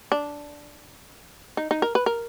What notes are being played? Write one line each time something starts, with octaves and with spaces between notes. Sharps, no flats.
D4
D#4
D#4
A#4
B4
A#4